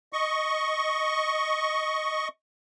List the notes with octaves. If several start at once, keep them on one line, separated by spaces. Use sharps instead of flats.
D#5 C#6